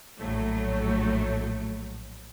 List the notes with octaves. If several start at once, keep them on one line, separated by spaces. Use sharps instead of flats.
A#1 A2 F#3 A3